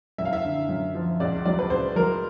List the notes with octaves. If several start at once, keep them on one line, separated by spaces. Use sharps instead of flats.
F#2 E5
F5
E5
D3
F#2
F3
C#2 D5
F#3 D5
B4
C#2 C5
F#3 A#4